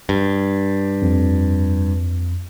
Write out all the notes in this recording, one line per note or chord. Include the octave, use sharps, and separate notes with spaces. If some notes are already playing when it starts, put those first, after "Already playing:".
G2
F2